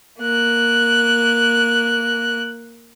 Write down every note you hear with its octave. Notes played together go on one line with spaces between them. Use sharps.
A#3 F#6